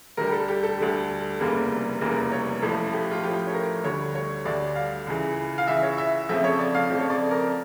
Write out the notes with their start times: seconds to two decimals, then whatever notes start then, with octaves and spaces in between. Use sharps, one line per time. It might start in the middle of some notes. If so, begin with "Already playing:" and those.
0.17 D2 D3 G3 A#4
0.27 G4
0.33 A4
0.48 G4
0.63 A4
0.78 D2 D3 G3
1.40 F1 E2 C#3 G3 A#3
2.01 F1 E2 C#3 G3 A#3 A#4
2.32 C#5
2.62 A1 A2 F3 A3 A4
2.93 G4
3.11 F4
3.23 A1 A2 F3 A3 G4
3.47 C#5
3.54 A#4
3.84 D2 D3 G3 C#5
4.15 C#5
4.45 D2 D3 G3 D5
4.75 F5
5.06 C#2 C#3 E3
5.58 F5
5.68 C#2 C#3 E3 E5
5.83 C#5
5.98 E5
6.29 F2 C#3 F3 A3 E5
6.44 C#5
6.59 D5
6.74 F5
6.89 F2 C#3 F3 A3
7.00 C#5
7.10 D5
7.31 A#4